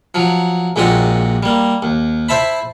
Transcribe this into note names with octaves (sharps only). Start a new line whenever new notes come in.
F3 F#3
A#1 A#2 G#3 C4 F#4 G4
G3 A#3
D#2
E4 C5 E5 A5 B5